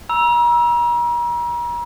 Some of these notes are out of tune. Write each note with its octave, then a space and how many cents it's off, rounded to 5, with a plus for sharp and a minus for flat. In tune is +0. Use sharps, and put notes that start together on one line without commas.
A#5 +40 E6 +0